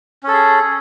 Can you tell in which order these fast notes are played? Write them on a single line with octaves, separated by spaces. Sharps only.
C#4 A4 G#4